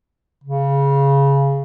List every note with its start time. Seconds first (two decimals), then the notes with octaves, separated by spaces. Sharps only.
0.43 C#3